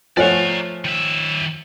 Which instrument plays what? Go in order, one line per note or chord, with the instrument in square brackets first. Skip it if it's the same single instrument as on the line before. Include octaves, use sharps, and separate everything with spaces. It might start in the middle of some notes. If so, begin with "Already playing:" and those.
[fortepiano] F3 A3 F#5 [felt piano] C#5 G#5 [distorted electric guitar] D5 A#5
[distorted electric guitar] D#3 E5